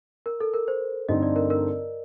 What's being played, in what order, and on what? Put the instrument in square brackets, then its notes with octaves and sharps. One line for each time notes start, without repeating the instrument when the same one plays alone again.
[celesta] A#4
A4
A#4
C5
[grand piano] G2 D3 A3 C4 D#4 [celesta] D#5
[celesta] D5
A#4
A#4